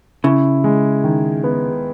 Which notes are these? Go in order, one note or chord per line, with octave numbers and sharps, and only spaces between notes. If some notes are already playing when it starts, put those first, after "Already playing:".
C#3 E4
G#3
D#3
B3